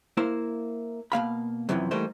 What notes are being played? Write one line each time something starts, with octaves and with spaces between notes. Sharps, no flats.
A#3 E4 C5
B2 A#3 F5 B5
F#2 C3 E3 F3
E3 G3 A3 A#3 D#4 C5